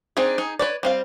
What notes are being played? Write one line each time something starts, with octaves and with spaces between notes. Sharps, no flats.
C4 D4 D#4 G#4
D#4 G#4
B4 C#5 D5
G3 C4 F5